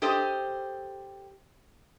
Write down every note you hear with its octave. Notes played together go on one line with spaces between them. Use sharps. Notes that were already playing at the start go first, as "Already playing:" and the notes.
G4 A4 C5 D#5